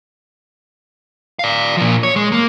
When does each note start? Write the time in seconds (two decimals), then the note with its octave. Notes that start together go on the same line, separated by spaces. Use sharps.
1.39 D5 F5
1.77 A#2 F3
2.03 C#5
2.16 G#3
2.32 A#3